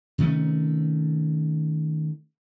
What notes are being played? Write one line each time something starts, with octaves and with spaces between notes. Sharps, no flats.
C3 D#3 A3 C#4